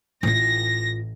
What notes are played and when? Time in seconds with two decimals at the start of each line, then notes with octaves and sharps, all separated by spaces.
0.23 A1 A2 F4 A#6